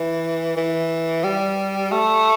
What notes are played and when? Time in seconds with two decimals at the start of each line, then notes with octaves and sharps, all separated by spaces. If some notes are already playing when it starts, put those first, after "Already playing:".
Already playing: E3
0.57 E3
1.24 G3
1.92 A3